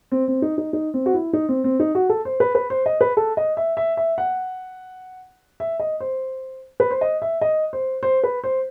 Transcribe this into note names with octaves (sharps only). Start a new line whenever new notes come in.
C4
C4
D#4
D#4
D#4
C4
F#4
E4
D#4
C4
C4
D#4
F#4
A4
C5
B4
B4
C5
D#5
B4
A4
D#5
E5
E5
E5
F#5
E5
D#5
C5
B4
C5
D#5
E5
D#5
C5
C5
B4
C5